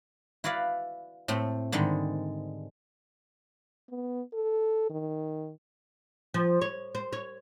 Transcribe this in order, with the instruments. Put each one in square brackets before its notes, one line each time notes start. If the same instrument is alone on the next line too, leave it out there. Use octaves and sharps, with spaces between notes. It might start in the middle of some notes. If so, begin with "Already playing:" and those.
[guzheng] E4 F#4 B4 D5 F5
A2 A3 C4
G#2 D3 D#3 G3 G#3
[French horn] B3
A4
D#3
[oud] F3
C#5
C5
C#5